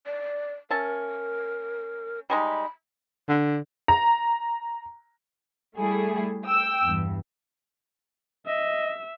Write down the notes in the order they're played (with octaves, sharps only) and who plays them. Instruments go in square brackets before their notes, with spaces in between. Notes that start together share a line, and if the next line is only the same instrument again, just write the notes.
[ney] D5
[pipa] C#4 E5 A5 [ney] A#4
[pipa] G3 G#3 D#4 [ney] B5
[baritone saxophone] D3
[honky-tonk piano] A#5
[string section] G3 A3 E4 G#4
G5 E6
E2 G2
[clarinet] D#5 [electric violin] E5